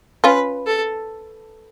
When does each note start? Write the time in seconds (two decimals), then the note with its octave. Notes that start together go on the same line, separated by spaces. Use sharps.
0.24 C#4 F4 B4
0.66 A4